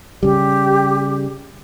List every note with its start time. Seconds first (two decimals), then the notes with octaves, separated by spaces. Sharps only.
0.23 C#3 G3 G4